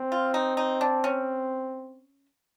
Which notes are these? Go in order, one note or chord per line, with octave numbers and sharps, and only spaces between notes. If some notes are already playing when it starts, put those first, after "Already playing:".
Already playing: C4
F4
D#4
D#4
D4
C#4